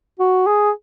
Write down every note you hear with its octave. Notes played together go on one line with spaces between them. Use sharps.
F#4
G#4